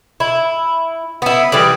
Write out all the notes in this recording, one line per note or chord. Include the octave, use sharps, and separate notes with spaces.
E4
B3 E4
E3 G3 G#4 D5